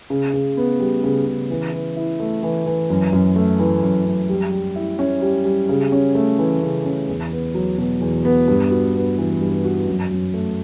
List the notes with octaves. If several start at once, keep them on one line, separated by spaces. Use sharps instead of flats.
C#3
C#3
B3
G3
C#3
C#3
E3
E3
E4
A3
E3
E3
F#2
F#2
A3
E3
F#2
F#2
G3
G3
E4
C#4
G3
G3
C#3
C#4
A3
E3
C#3
C#4
E2
B3
F#3
B2
E2
B3
G2
F#4
B3
E3
G2
F#4
F#2
F#2
A3